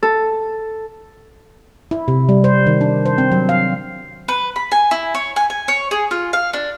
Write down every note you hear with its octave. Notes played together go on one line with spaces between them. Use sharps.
A4
E4
C3
G3
C5
D#3
D4
C5
C4
F#3
F5
B4
B5
G#5
E4
C#5
G#5
G#5
C#5
G#4
F4
F5
D4